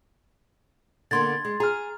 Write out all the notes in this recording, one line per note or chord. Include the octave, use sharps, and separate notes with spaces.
D3 A#3 B3 C6 G#6 A6
G#3
G#4 A#5 F6